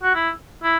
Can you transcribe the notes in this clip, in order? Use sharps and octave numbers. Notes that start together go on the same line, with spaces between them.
F#4
E4
E4